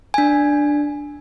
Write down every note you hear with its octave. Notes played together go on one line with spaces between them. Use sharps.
D4 G#5